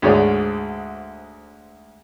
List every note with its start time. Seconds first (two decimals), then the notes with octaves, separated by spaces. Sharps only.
0.02 D2 G#2 G#4 C#5 D5